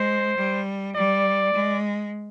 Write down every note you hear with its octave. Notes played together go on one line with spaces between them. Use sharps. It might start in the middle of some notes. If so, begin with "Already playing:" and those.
Already playing: G#3 C5
G3
G3 D5
G#3